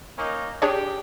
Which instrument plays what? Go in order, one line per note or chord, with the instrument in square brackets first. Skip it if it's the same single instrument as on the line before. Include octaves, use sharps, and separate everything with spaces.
[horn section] A#3 C#4 D#4
[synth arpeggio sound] D4 G#4 C#5 [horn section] G4